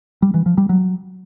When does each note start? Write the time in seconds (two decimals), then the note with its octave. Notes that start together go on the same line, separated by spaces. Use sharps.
0.22 G3
0.34 E3
0.46 F3
0.58 G3
0.69 F#3